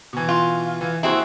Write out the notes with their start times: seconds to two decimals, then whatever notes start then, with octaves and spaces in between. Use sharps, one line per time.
0.13 B2 E3
0.29 F4
0.81 E3
1.03 D#2 C4 E4 F#4 G#4